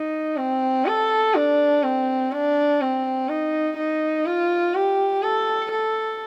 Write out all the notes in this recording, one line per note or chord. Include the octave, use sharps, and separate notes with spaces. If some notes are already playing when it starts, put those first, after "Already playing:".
Already playing: D#4
C4
A4
D4
C4
D4
C4
D#4
D#4
F4
G4
A4
A4